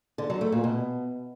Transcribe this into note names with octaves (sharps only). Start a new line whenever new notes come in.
D3
F#3
A3
A#2
B2